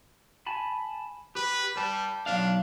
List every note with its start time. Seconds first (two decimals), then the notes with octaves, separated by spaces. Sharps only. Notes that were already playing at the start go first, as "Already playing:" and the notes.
0.47 G#5 A5 B5
1.35 G4 B4
1.76 G3 B4 A5
2.26 B1 D4 F5